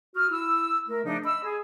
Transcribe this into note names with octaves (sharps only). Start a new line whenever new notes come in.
F#4 D#6 F6
E4 E6
A3 A#4
C#3 F3 A3 D4 D#4
D#5 B5 E6
G#4